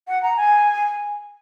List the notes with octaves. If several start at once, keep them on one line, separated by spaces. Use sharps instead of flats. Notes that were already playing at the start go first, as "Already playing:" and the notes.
F#5
A#5
G#5